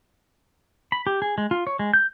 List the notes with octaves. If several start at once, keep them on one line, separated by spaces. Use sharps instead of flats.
B5
G4
G#4
G#3
F4
C#5
G#3
G6